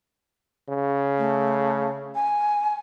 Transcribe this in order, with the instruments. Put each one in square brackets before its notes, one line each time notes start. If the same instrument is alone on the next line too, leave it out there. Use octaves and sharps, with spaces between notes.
[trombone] C#3
[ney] A3
G#5